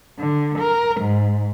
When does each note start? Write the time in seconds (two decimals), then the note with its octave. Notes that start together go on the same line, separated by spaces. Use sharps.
0.17 D3
0.57 A#4
1.00 G#2